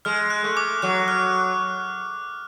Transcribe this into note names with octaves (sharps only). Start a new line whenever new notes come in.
G#3 F6
F#6
A3
D6
F#3 F#6
F6